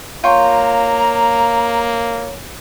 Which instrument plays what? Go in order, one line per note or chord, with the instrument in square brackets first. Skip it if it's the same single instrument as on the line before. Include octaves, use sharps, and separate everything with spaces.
[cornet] A#3 [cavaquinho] F4 G5 C#6 [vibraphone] C#5 [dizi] A#5